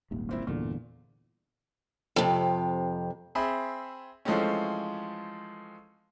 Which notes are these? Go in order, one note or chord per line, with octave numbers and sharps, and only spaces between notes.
D#1 G#1 D#2
A#2 C4 E4
G1 E2 A#2 D3
F2 C3
C4 G#4 E5 B5
E3 F3 G#3 A3 C4 C#4